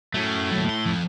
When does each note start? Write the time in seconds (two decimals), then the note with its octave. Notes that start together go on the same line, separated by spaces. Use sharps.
0.14 A2 F#3 A3 C#4
0.52 D#2 F#3
0.70 C6
0.86 F2